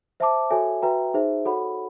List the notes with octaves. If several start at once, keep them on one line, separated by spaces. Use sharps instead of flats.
C5 E5 A5 D6
F#4 A4 C#5 E5 G#5
F#4 B4 E5 G5 A#5
D#4 G#4 C5 E5
F#4 A4 C#5 F#5 B5